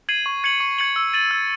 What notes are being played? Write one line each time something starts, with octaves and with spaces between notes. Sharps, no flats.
G#6 C7 D#7 F#7
C#6
G#6 C#7 F#7
C#6
G#6 C#7 F#7
E6
A6 D#7 F#7
E6